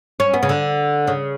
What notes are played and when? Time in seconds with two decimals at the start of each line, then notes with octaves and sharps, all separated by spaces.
0.20 C#4
0.34 B3
0.43 C#3
0.49 D3
1.07 C#3